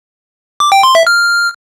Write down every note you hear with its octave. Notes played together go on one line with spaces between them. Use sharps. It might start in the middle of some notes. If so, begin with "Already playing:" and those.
D6
G5
C6
E5
F6